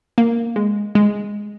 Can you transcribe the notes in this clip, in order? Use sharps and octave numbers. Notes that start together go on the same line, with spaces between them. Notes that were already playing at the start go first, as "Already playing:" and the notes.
A#3
G#3
G#3